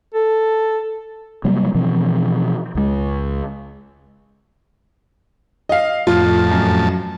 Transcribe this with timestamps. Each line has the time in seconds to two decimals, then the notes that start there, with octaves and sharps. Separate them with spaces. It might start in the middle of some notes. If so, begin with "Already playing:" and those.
0.15 A4
1.44 C3 F#3 G3 A#3
1.75 B2 E3 F3 C4
2.75 C#2 G#3
5.69 D#5 F5
6.07 F2 A2 F4 A5
6.51 F#2